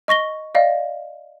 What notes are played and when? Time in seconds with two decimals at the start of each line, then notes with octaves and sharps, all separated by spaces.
0.08 D#5 C#6 A#6 G7
0.55 D5 D#5 F5